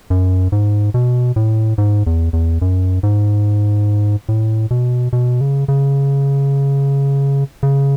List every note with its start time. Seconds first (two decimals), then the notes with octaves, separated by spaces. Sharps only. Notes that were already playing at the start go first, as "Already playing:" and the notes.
0.10 F#2
0.52 G#2
0.94 B2
1.36 A2
1.78 G#2
2.07 E2
2.33 E2
2.62 F#2
3.03 G#2
4.29 A2
4.71 B2
5.13 B2
5.41 C#3
5.68 C#3
7.63 C#3